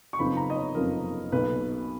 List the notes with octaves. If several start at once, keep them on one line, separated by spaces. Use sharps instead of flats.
C#6
F#1 F2 F3 B3 D#4 B5
A#5
D#5
C#5
F#1 F2 F3 B3 D#4 A#4
B1 B2 A#3 D#4 B4